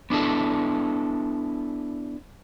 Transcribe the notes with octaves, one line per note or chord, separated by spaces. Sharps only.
B3 D4 E4 A4